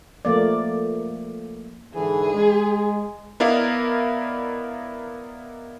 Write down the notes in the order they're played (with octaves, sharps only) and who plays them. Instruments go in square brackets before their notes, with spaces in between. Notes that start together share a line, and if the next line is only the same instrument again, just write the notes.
[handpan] F3 A3 A#3 D5
[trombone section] G#2 D3 E3 [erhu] G#4
[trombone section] G#3
[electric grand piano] B3 E4 A#4 D5 D#5 F5